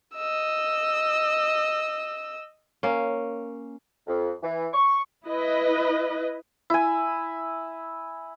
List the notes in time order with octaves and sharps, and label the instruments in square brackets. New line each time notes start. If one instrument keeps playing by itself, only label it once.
[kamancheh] D#5 E6
[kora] A#3 C#4
[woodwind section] F2
E3
C#6
[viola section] E4 B4 D#5
[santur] E4 G#5